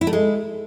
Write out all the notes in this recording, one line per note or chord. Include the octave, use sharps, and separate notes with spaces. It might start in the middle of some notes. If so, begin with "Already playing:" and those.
E4
A3
G#3